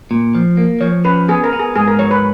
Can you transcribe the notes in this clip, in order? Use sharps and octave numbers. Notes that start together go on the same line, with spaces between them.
A#2
F3
A#3
F3 C#5
C#4 B4
B3 G#4
A#4
B3
G#4
G#2 G#4
A#4
F#3 C#5
B4